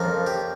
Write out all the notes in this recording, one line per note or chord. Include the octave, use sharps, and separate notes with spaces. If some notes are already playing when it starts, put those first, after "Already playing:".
Already playing: F2 C#3 F3 A#3
G4